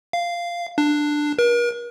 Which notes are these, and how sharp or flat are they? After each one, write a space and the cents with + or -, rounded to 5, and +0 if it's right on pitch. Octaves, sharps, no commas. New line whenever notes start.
F5 -10
D4 +10
A#4 +45